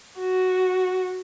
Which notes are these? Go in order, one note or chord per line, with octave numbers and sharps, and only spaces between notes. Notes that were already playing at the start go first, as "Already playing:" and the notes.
F#4